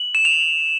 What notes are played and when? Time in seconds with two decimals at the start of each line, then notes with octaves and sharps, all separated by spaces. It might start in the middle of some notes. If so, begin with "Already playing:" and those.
Already playing: F#7
0.15 E7
0.25 F7